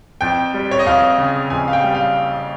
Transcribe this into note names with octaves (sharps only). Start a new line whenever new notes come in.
F2 G5
G3
C#5
D#5
F2 F5
C#3
F2 G#5
F5
G5
G3
F5